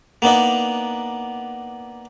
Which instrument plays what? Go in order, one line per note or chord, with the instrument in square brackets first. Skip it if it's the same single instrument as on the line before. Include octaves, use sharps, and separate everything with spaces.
[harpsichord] A#3 B3 D4 D#4